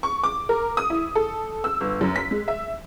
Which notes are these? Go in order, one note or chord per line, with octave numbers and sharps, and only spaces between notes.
C#6
D6
A#4
D#6
E4
A4
E6
G1
F#2
B6
G#3
E5